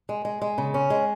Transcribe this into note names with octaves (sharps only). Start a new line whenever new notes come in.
G#3
G#3
G#3
C#3
C#4
G#3